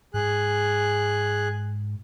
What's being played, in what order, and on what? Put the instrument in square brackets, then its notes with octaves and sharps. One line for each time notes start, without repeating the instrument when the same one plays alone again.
[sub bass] G#2 [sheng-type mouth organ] G#4 F#6